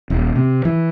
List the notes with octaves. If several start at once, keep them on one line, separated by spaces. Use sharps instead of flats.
D#1
C3
E3